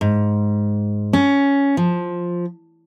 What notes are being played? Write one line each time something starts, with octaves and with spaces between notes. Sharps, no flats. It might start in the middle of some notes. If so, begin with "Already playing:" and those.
G#2
C#4
F3